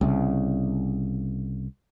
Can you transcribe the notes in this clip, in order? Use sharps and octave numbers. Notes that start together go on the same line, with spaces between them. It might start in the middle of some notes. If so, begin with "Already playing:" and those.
C2 C#3